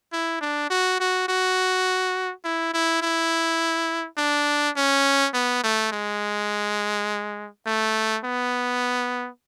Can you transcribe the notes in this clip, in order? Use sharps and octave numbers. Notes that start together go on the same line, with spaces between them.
E4
D4
F#4
F#4
F#4
E4
E4
E4
D4
C#4
B3
A3
G#3
A3
B3